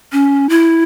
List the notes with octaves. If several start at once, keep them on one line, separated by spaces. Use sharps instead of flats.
C#4
E4